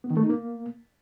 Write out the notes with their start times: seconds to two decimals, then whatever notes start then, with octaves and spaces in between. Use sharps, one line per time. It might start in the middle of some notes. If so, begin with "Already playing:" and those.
0.04 B3
0.10 D#3
0.17 A3
0.23 D#4
0.29 A#3